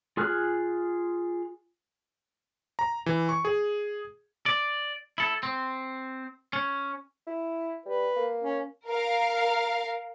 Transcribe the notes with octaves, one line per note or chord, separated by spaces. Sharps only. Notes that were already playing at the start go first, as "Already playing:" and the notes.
F4 G#4 G#5 F6 F#6
A#5
E3
C#6
G#4
D5
E4 A4
C4
C#4
E4
G3 B4
A#3
C#4
A#4 F5